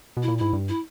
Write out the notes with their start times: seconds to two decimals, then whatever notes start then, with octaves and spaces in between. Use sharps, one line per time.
0.17 B2
0.22 E4
0.28 A#2
0.38 G#2 E4
0.53 G2
0.69 E4